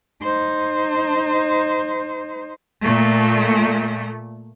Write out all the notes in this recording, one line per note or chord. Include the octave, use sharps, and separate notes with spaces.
D#4 C5
A#2 A3